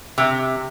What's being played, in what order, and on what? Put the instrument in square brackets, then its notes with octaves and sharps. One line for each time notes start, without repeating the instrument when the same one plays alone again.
[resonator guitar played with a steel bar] C3